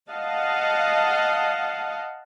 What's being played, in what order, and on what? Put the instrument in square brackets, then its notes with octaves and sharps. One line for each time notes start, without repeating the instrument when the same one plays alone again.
[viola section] D#5 F5 F#5 A5